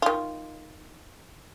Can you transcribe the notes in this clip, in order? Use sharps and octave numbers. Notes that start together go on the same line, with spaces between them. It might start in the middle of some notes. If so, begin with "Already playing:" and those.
D#3 F4